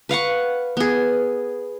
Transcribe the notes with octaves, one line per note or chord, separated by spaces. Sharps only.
B4 F5 F#5 C#6
B3 G#4